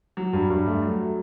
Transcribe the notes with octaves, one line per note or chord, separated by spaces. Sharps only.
F#3
G2
G2
A3
F#3